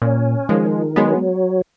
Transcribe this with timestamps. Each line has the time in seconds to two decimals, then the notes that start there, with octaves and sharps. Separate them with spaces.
0.02 A#2 C#4
0.49 D#3 F3 G#3
0.96 F#3 G#3 B3